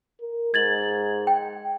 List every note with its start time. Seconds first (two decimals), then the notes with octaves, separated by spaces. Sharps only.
0.21 A#4
0.54 G#2 G#6 A6 F#7
1.27 G5